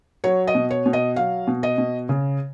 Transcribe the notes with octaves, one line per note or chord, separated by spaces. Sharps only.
F#3 C#5
D#5
B2
C#5
B2
D#5
F#3 F5
B2
D#5
B2
C#3